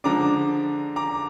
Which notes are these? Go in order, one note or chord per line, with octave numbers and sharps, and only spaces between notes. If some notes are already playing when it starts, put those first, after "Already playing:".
D3 F3 G#3 D4 A#5 D6
A#5 D6